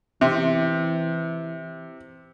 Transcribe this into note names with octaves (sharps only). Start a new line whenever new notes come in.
C3 E3